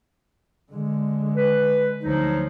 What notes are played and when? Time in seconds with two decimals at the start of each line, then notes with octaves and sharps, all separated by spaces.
0.72 D3 G#3
1.36 B4
2.03 D2 F3 F#3 D#4